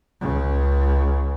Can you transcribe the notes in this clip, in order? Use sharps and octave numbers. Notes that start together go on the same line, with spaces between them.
C#2 C#3